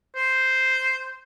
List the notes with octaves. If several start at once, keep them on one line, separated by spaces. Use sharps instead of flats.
C5